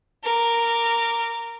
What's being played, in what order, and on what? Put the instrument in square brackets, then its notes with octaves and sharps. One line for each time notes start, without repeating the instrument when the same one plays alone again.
[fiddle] A#4 D6